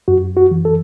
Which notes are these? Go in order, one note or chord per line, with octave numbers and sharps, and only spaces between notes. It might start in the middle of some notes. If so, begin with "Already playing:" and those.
F#2 F#4
F#4
E3
A4